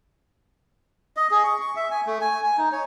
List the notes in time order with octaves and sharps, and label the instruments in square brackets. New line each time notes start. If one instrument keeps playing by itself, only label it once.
[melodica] D#5
G#4
C#6
C#6
E5
G#5
A3
G#5
G#5
D#4
C#5